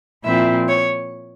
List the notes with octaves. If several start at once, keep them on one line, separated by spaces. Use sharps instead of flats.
A#2 F3 C4 E4 E5
C#5